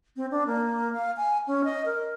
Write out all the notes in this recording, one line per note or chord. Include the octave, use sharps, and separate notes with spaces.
C4
D4
A#3
F5
G#5
C#4
D#5
A#4